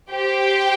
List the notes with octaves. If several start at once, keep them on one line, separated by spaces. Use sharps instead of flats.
G4 C5 G5